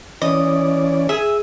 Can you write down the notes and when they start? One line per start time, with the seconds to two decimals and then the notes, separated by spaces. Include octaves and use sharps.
0.22 E3 C#4 D5 D#5
1.09 G#4 E5